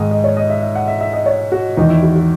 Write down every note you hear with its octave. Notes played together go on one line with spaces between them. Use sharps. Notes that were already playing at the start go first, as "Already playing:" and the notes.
Already playing: G#2 D#3 D#5
D#5
C#5
D#5
E5
E5
F#5
E5
E5
D#5
C#5
F#4
E2 D#3 D#4
E4
F#4
F#4